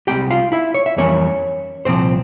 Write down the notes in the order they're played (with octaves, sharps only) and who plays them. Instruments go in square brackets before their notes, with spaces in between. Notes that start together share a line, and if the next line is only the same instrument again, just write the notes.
[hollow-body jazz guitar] C2 A#2 G#3 C4 G4 G5
F4 F5
E4 E5
C#5
E5
F2 E3 G3 A#3 C#4 C#5
C2 A#2 F3 C4 C5